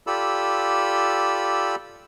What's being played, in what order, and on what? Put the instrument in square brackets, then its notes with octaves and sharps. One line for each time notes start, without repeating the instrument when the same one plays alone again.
[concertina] F4 G4 A4 D5 B5 E6